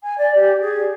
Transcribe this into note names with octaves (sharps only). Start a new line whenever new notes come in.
G#5
D5
G4
G#4